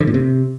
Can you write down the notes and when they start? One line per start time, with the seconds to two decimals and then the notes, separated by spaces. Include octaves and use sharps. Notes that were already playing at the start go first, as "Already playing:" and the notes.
0.01 D3
0.07 A#2
0.14 C3